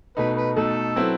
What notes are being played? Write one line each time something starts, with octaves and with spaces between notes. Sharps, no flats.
B2 A3 D#4 B4
B4
B2 A3 D#4 A4
F#3 C4 E4 B4